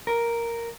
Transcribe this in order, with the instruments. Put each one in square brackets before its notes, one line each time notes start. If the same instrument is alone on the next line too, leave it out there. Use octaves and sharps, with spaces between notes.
[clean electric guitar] A#4